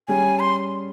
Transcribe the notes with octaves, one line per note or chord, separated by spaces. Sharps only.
G3 C#4 G#4 G#5
C6